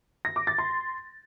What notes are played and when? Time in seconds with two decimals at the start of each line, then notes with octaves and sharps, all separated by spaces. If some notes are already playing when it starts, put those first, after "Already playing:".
0.25 A#6
0.36 D6
0.47 A6
0.58 C6